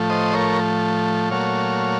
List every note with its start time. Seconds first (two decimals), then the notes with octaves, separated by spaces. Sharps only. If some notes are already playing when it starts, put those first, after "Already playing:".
Already playing: A2 F3 A3
0.10 C5 D#5
0.33 A#4 C#5
1.31 A#2 F#3 A3 C#5 F5